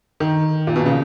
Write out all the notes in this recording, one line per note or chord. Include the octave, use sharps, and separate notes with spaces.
D#3
A#2
B2
C#3